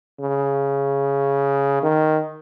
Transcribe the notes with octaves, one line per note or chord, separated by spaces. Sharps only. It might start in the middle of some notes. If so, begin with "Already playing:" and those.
C#3
D#3